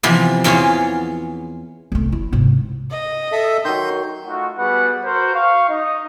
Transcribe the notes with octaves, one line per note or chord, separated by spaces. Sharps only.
C3 E3 F3 B3
E2 E3 F4 G#4 C#5
C2 A3
E4
G#2 C3
D#5
A4 E5
D#3 F#3 C6 G6
A3 D#4 F4 F#4
G3 B3 F#4 G#4 B4 F#5
F#4 A#4 C5
F5 C#6
D#4 D#5